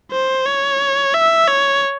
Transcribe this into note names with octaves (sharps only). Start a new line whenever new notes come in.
C5
C#5
E5
C#5